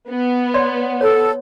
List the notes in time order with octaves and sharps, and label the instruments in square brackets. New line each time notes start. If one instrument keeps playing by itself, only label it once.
[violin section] B3
[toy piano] C#5 D5 C6
[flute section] A4 [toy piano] C#5